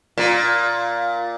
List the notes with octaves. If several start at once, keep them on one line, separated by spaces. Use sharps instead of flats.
A#2